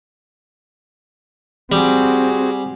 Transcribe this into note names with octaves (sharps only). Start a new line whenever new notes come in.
G3 C4 F#4 G#4